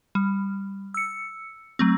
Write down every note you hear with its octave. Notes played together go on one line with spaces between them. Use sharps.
G3
E6 C#7
F#3 A3 C4